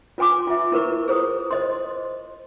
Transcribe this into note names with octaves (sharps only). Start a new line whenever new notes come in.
F4 B4 G#5 C6 D6
F4 E5
E4 A#4 B4 C#6
G#4 C5 A#5 D#6
C5 D#5 C6